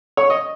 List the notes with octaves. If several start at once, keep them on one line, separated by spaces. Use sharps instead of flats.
C#5
D#5